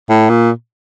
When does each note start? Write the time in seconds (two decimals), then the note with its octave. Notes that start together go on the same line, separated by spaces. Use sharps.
0.10 A2
0.29 A#2